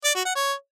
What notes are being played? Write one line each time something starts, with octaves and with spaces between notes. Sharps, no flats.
D5
F#4
F#5
C#5